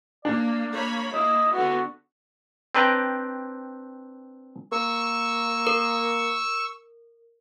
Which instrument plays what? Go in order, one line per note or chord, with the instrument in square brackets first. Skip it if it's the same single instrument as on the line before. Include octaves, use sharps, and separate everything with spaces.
[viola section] A#3 [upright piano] D4 [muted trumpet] D5
[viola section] A#3 C#5 B5
[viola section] A#3 E4 [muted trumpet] D#5
[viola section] D3 B3 [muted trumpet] F#4
[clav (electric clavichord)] C4 D4 B4 G5 A#5
[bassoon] A#3 [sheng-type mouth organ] C#6 E6
[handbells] A#4